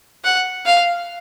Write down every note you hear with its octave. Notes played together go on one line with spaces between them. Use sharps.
F#5
F5